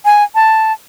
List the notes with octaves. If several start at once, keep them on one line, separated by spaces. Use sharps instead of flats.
G#5
A5